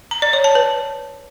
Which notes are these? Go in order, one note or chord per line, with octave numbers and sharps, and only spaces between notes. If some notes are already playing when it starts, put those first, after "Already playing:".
A#5
D5
C#5
A5
B4